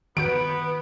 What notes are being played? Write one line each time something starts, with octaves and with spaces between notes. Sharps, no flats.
D#3 B3 F#4 B4 G6 D7